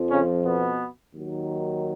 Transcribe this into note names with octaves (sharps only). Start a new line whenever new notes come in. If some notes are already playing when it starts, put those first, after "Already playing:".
Already playing: F2 F3
C#3 C#4
B2 B3
D#2 D#3 F#3